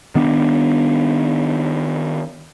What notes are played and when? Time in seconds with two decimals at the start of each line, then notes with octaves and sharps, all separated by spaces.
0.15 D#3 B3 D4